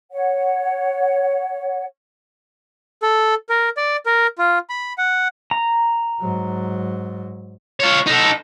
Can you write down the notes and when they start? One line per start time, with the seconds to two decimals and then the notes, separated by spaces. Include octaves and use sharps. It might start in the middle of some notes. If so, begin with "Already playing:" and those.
0.12 C#5 F#5
3.02 A4
3.49 A#4
3.77 D5
4.06 A#4
4.38 F4
4.70 B5
4.98 F#5
5.51 A#5
6.21 G#2 F#3
7.80 F4 C#5
8.07 D#4 A4